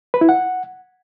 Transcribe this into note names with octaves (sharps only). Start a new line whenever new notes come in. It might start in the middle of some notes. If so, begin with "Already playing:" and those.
B4
E4
F#5